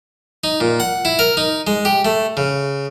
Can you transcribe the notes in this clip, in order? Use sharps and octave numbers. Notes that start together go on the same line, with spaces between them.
D#4
A#2
F#5
E4
A#4
D#4
G#3
G4
A3
C#3